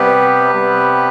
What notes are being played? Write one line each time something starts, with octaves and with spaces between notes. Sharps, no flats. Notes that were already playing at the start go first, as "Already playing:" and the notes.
Already playing: C3 G3 B3 G4 B4
C3 G3 B3